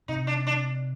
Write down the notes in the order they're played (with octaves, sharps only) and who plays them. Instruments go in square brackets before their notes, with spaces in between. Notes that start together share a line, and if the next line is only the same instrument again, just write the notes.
[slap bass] C3 [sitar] D#4
[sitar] D4
D4